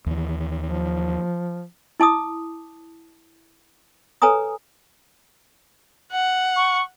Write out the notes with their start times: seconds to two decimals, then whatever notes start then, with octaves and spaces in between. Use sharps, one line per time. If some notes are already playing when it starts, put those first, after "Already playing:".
0.06 D#2 E3
0.67 F3
2.00 E4 A5 D6 D#6
4.22 A4 B4 C#5 G#5 A#5 D#6
6.12 F#5
6.56 C#6